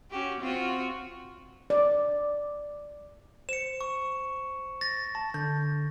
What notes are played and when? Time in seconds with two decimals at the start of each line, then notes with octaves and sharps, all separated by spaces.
0.10 C#4 F#4 G4
0.41 C4 F4 F#4
1.70 D5
3.49 C5 C#7 E7
3.81 C#6
4.81 A6 A#6
5.15 A5
5.34 D3 G6